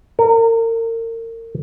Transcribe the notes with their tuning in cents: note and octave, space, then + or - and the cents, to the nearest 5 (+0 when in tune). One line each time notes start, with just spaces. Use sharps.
A#4 -35